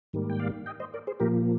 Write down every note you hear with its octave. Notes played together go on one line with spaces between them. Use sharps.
G#2 D#3 G3 A#3
G5
D5 F5
D#5 G5
C5 D#5
A#4 D5
G#4 C5
A#2 F3 A#3 G4 A#4